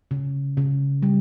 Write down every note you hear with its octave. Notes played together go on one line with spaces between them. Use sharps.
C#3
C#3
G3